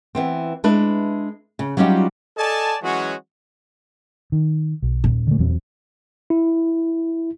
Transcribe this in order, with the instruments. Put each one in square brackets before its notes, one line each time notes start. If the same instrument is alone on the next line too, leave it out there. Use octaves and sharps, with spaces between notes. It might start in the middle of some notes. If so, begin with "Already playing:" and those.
[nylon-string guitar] E3 B3 C4
G#3 D4 E4 B4
C#3
F#3 G3 C#4 D#4 F4 G4
[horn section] A4 D5 D#5 G#5 A5
E3 F#3 G#3 C#4 F#4
[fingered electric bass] D#3
B1
[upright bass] D#1
[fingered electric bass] D3 A3
E2 F#3 C4
[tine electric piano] E4